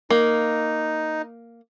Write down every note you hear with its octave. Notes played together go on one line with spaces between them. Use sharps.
A#3 D#4